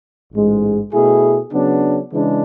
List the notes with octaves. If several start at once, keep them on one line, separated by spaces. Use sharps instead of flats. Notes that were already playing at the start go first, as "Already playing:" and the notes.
A1 G#2 G#3
B2 A3 E4 G#4
C#3 F#3 B3 D4
C#3 E3 G#3 D4